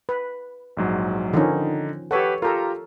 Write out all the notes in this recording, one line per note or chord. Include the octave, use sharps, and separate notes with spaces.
B4
A#1 G#2 F#3
D3 D#3 F3 C#4 D#4
G4 A4 B4 C#5 F#5
F4 G4 A4 A#4 A#5